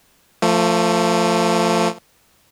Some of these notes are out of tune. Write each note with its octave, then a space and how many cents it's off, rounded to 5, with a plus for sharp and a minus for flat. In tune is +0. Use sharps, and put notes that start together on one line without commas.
F3 +0 A3 +25